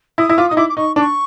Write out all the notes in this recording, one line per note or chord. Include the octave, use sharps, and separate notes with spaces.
E4 D#6
E4
F4 D6
D#4 D#6
E4 D6
D6
D#4 C#6
D4 D6
C#6